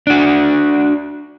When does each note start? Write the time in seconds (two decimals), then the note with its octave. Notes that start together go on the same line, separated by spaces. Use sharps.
0.07 D4 F#4